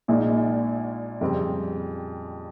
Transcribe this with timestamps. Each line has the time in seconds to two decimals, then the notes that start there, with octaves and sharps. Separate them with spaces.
0.08 A#1 A#2 G#3 D#4
1.21 F2 C#3 G3 C4